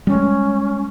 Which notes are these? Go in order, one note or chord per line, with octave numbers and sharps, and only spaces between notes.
G3 G#3 C#4